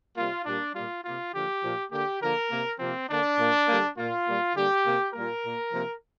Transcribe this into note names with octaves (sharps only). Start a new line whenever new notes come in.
C3 G3 A#3 F4
A#2 G3 A#3 D4
A#2 G3 A#3 F4
C3 A#3 F4
D3 F3 A#3 G4
A#2 F3 A#3
D3 A#3 G4
D3 F3 A#3 A#4
C3 A#3
C3 F3 A#3 C4
D3 A#3 D4
A#2 A#3
D3 G3 A#3
A#2 A#3 F4
A#2 G3 A#3
D3 G3 A#3 G4
C3 A#3
A#2 G3 A#3 A#4
A#2 A#3
C3 F3 A#3